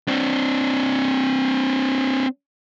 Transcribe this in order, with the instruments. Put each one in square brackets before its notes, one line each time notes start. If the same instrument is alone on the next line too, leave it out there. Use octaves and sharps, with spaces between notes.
[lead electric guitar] C4 D4